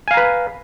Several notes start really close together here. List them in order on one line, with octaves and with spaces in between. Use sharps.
G#5 F5 A#5 B4